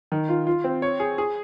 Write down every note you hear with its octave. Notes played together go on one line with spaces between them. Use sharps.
D#3
F4
F4
C4
C#5
G#4
G#4